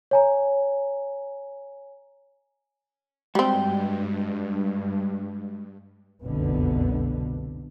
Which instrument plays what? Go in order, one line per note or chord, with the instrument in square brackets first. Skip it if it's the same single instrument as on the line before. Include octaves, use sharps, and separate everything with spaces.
[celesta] C#5 G#5 A#5
[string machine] G2 [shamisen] G3 C4 [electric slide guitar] G#3 F#4 G5
[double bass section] F1 C2 F#2 B2 D3 B3